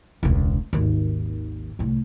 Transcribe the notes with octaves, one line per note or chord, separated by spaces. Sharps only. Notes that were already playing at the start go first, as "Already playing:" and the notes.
E1 C#2
G#1 D#2
C2 A2